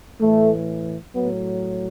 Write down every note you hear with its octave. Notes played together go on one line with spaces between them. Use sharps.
A2 E3 A3
A2 F#3 B3